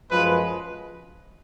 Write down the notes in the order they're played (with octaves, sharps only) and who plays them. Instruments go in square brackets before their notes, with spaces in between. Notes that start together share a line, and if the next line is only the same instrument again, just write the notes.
[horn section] F#2 F3 G#3 B4